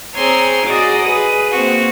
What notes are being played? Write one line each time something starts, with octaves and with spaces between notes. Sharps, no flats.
C4 G#4 C#5 G#5 A#5 C6
F#4 G#4 D5 D#5
G#4 B4
A#3 C4 F#4